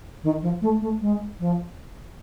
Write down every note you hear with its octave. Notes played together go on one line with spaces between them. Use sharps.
D#3
F3
A3
A3
G#3
F3